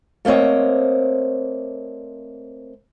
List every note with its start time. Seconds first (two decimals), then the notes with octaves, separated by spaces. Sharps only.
0.25 A3 A#3 C4 C#5 D#5